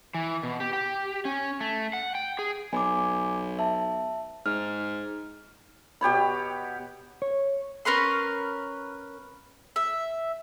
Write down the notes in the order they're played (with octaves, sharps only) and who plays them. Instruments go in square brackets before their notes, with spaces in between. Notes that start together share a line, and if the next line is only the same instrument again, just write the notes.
[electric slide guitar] E3
B2
G4
G4
C#4
A3
F#5
G5
G#4
[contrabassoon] B1 [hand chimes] G#5 D6
[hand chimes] E5 A5
[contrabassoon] G#2 [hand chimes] F6
[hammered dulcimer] B2 G4 C#5 B5
[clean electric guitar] C#5
[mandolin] C#4 A#4 B4 C6
E5